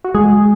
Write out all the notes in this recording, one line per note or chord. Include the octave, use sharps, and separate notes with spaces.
F#4
G#3 G#4